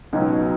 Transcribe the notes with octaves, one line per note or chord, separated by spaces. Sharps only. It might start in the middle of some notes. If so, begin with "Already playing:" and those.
C#2 B2 F#3 D#4